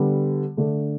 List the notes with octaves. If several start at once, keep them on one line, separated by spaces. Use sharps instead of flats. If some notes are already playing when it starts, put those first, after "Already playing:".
Already playing: D3 G3 B3
D3 A3 D4